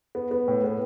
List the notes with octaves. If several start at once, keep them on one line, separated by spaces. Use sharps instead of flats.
B3
B3
A2
B3